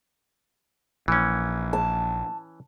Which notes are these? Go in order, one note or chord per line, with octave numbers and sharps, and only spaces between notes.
A#1 E3 C#4
A5